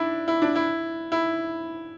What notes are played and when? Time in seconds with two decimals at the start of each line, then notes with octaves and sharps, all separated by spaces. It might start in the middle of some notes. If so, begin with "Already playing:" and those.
Already playing: D4 E4
0.28 E4
0.42 D4
0.55 E4
1.12 E4